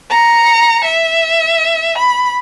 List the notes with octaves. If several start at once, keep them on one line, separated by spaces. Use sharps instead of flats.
A#5 C#7
E5
B5